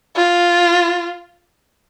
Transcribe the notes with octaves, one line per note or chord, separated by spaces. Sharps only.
F4